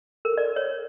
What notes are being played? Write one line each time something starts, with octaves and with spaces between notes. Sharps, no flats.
A#4
D5
C#5